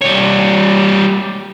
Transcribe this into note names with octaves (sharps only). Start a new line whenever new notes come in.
G3 C#5